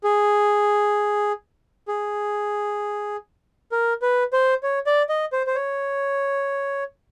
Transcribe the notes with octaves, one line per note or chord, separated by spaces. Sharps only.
G#4
G#4
A#4
B4
C5
C#5
D5
D#5
C5
C5
C#5